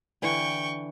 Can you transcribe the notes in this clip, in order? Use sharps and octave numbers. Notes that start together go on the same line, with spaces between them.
D3 E3 G5 C#6